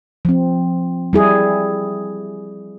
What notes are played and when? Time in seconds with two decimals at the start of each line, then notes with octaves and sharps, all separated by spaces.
0.25 F3 C4
1.13 G3 E4 G#4